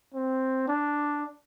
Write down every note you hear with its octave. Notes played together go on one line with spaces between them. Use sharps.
C4
D4